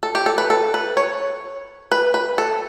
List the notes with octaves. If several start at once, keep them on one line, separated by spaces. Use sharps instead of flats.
A4
G4
A4
B4
A4
B4
C#5
B4
B4
A4